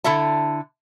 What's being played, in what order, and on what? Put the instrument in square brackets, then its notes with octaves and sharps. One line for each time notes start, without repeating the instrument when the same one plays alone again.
[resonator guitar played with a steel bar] D3 E4 A4 E5 A5